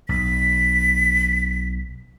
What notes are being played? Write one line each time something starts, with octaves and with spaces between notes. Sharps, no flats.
B1 B6